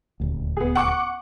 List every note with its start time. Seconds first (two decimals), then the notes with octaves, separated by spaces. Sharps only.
0.20 D#1 D2
0.57 B3 G#4
0.75 F#5 C#6 D6